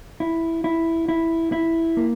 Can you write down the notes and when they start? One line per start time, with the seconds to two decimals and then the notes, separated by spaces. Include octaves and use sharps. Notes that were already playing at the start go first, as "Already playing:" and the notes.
0.20 E4
0.64 E4
1.09 E4
1.52 E4
1.97 A#3